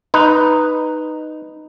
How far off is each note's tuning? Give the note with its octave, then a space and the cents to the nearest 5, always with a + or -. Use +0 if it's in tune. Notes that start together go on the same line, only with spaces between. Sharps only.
D#4 -5 B4 +0